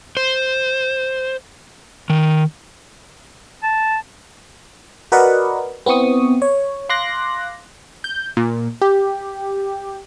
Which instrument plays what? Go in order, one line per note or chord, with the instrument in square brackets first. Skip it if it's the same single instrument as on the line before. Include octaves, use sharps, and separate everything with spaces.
[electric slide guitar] C5
D#3
[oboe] A5
[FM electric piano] F#4 A#4 B4 D5 D#5 F#5
B3 C4 E4 C#6 D#6
C#5
F5 C6 D6 F#6 A#6
[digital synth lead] G6
A#2
G4